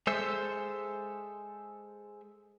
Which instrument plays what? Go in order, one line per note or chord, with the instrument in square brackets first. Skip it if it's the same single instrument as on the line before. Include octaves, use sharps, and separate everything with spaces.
[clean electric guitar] G#3 A4 C5 E5